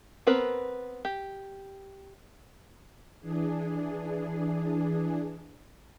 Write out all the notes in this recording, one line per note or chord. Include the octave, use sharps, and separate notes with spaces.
B3 C4 A#4 B4
G4
E3 D4 G#4